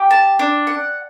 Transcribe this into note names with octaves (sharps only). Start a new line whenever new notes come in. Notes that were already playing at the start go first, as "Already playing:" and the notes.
Already playing: G4
A5
D4
F#5